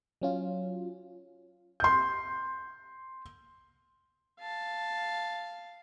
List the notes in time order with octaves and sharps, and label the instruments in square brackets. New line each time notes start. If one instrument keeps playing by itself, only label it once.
[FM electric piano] F#3 C#4 F4
[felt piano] C6 G6
[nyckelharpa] F5 A5